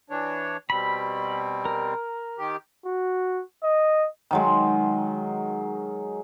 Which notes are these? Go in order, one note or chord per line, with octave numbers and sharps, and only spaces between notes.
E3 D4 C#5
B2 G3 C4 B5
A#4
D#3 G4
F#4
D#5
D#3 F#3 G#3